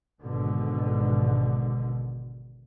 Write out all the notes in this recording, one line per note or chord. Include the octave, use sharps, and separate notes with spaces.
G#1 B2 D3